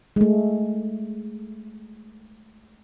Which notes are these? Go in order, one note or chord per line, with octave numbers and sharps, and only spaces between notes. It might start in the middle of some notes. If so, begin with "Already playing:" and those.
G#3 A3